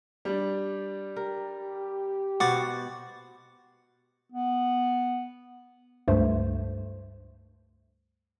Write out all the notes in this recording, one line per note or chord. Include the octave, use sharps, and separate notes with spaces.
G3 D4
G4 A#4
B2 F#4 C5 F#5 D6 A6
B3
C#2 G2 A3 C5